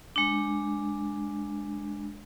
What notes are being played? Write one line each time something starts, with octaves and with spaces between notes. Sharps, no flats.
G#3 D4